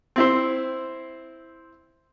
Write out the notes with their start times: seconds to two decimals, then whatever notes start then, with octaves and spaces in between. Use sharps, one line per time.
0.16 C4 E4 C5